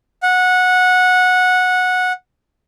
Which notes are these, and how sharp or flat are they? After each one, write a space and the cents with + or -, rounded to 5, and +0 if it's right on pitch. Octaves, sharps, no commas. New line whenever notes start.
F#5 -15